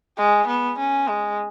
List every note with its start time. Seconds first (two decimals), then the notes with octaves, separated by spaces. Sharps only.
0.17 G#3
0.47 B3
0.78 C#4
1.08 G#3